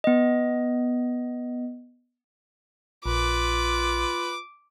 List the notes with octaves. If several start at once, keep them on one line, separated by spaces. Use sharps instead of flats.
B3 D#5
A#1 F4 B4 D6